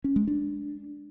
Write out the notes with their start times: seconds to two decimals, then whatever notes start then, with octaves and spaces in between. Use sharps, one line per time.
0.04 C#4
0.16 G#3
0.27 D4